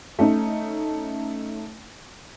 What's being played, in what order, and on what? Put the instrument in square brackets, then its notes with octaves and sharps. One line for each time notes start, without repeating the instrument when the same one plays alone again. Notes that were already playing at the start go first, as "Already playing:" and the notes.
[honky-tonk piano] A3 C#4 D#4